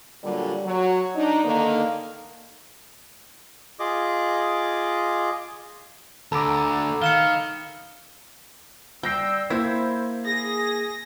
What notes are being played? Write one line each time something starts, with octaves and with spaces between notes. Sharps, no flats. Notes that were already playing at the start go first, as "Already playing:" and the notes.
A#2 D3 F#3 G3
F#3
D4 D#4
D3 D#3 A#3
F4 G#4 D#5 D6
D2 A4 A#5 B5 D6 E6
D#3 F5 C#7 E7 G7
G3 G5 E6 G6 A#6 C7
A#3 E4 C5 E6 G#6
G#4 A#6